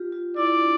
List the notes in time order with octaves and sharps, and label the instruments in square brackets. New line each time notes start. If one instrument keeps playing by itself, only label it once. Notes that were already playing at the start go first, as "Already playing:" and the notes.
Already playing: [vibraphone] F4 G4
F4
[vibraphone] E4 [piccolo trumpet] D5
[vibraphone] D4